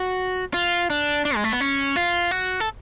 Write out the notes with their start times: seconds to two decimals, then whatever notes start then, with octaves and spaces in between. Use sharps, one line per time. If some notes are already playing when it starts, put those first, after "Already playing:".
Already playing: F#4
0.54 F4
0.90 D4
1.25 D4
1.36 G#3
1.44 A3
1.53 B3
1.61 C#4
1.96 F4
2.31 F#4
2.60 A4